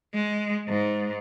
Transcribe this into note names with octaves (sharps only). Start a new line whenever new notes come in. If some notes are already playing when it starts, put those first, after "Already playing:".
G#3
G#2